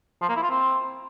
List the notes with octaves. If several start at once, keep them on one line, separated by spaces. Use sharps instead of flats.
F3
A#3
E4
F4
C4